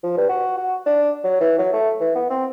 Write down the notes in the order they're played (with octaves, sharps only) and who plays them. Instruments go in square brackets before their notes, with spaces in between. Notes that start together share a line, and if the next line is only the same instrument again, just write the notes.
[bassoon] F3
G2
F#4
F#4
D4
F#3
E3
F#3
A3
E3
B3
C4